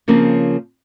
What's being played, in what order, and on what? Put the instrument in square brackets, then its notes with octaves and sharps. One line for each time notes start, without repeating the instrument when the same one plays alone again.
[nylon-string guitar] C#3 F3 A#3 C4 C#4